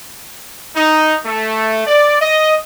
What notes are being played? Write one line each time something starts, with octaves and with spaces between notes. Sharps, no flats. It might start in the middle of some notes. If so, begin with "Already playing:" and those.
D#4
A3
D5
D#5